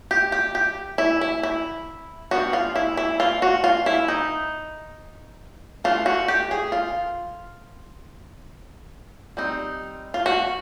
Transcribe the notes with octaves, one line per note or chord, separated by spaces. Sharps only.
G4
G4
G4
E4
E4
E4
G3 B3 D4 F#4
F4
E4
E4
F4
F#4
F4
E4
D#4
E3 A3 D4 F4
F#4
G4
G#4
F4
G3 C4 D#4
F4
F#4